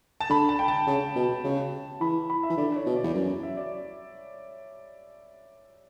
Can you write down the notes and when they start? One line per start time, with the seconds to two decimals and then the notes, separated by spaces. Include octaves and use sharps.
0.20 A5
0.30 D3 B5
0.49 A5
0.59 G5
0.68 A5
0.87 C#3
1.16 B2
1.44 C#3
2.01 E3 B5
2.30 B5
2.43 E5
2.50 E3
2.58 D3 D5
2.76 C#5
2.86 B2
2.96 D5
3.04 E2
3.15 F#2
3.43 E5
3.57 D5